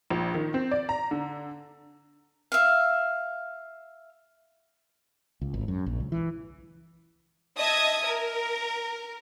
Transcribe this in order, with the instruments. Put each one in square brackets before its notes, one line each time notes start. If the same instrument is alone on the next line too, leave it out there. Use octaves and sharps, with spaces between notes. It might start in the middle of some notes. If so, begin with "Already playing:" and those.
[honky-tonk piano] A#1
D#3
C4
D5
A#5
D3
[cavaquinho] E5 F5
[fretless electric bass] C#2
G#1
F#2
A#1
C#2
E3
[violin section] D#5 E5 A5 D#6 G#6
A#4